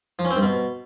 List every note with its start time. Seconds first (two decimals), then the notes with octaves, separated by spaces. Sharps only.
0.19 F3
0.25 C#4
0.31 C4
0.36 G2
0.42 B2